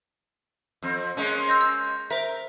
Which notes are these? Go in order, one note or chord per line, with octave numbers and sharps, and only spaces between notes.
F2 C4
G#3 A#3 C#4
E6 G6 A#6
E6
A#4 C5 E5